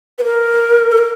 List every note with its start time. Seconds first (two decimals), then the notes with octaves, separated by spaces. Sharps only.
0.19 B4
0.24 A#4
0.92 A4
0.98 A#4